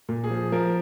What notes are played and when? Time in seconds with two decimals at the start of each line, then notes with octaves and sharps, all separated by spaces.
0.09 A#2
0.24 G#4
0.31 F3
0.52 F3 A#4